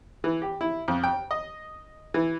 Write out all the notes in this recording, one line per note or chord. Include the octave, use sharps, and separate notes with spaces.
E3
G4
E4
F2
G5
D#5
E3